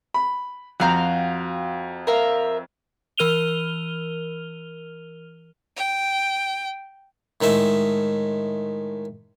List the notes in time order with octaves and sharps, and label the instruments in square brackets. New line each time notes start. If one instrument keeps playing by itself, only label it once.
[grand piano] B5
[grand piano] F2 A#5 [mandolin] F#4 F5 G5
[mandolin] A#4 E5 F5
[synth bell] E3 A#4 F6 D#7 F7 G7
[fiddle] G5
[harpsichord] A2 D#3 G#3 E5